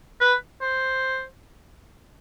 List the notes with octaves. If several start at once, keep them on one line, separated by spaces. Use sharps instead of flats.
B4
C5